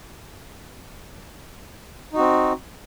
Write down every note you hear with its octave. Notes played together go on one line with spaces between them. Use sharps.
C4 D#4 F#4